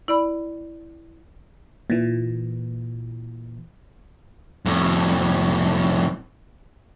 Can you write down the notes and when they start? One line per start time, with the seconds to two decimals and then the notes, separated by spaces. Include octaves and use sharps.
0.08 E4 D5 B5
1.90 A#2 E3
4.66 F2 A2